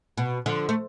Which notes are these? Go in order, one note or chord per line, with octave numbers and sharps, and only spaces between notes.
B2
D3 F3
A3